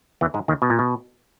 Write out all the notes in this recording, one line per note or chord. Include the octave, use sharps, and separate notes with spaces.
E2 E3
G#2 G#3
D#2 D#3
B2
A#2
B2